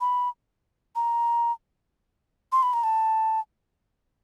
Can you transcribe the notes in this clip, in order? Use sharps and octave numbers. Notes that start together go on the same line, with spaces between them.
B5
A#5
C6
B5
A#5
A5